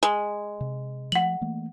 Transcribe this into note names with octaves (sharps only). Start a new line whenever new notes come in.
G#3
C3
F3 A3 F#5 F#7
E3 A3 A#3